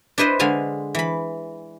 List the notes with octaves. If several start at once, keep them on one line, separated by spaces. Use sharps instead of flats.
D4 E4 B4 C5 D#5
D3 G#3 F5 G#5
E3 B5